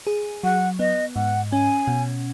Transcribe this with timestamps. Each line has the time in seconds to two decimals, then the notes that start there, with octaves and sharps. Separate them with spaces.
0.07 G#4
0.43 F#3 F#5
0.79 B3 D#5
1.16 G#2 F#5
1.52 C#4 G#5
1.87 B2